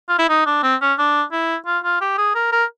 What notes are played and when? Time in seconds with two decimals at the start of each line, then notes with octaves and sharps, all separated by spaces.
0.09 F4
0.19 E4
0.29 D#4
0.46 D4
0.63 C4
0.81 C#4
0.98 D4
1.32 E4
1.66 F4
1.84 F4
2.01 G4
2.18 G#4
2.35 A#4
2.52 A#4